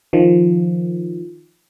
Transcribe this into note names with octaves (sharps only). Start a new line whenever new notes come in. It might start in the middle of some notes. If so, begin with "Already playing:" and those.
D#3 F3